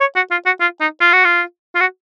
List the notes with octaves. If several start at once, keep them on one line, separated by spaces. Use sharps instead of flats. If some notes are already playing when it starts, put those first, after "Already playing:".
C#5
F#4
F4
F#4
F4
D#4
F4
F#4
F4
F4
F#4